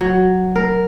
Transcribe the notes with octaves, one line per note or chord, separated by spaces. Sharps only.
F#3
A#4